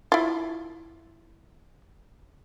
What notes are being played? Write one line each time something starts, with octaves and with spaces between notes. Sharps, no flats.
E4 F4